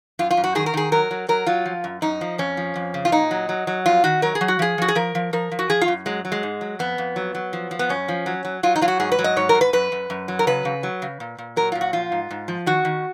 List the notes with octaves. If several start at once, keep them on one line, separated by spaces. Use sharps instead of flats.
F#2 F4
F4
F#2
F#4
D#3 G#4
A#4
D#3 G#4
F#3 A#4
F#3
F#3 A#4
F#3 F4
F3
F#2
F#2 D#4
F3
F2 C#4
F3
F2
C#3
F4
A#2 D#4
F#3
F#3
F#3
F2 F4
D#3 F#4
F#3 A#4
G#4
F#3
F#4
F3 G#4
F3 F#4
G#4
F3 A#4
F3
F3 A#4
F3
F#4
F3 G#4
F4
F#2
F#3 G#3
F#3
G#3
G#2
F#3
F2 B3
F2
F#3
F#3
F3
F3
B3
F#2 C#4
F3
F#3
F#3
F#3 F4
D#4
F#3 F4
F#4
G#2 G#4
B4
F#3
D#5
G#2 C#5
A#4
G#2
B4
F#2 B4
F#2
F#2
F#3
A#4
C#3 B4
C#3
F#3
C#3
A#2
A#2
F#3 A#4
A#2 F4
F#4
F3 F4
G#2
G#2
F3
D#3 F#4
D#3